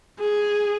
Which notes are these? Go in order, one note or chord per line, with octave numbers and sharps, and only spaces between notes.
G#4